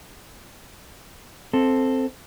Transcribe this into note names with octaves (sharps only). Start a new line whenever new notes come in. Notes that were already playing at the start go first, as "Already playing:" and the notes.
C4 A4